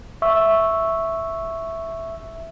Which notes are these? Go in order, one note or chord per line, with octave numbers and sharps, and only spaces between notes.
E5 C#6 E6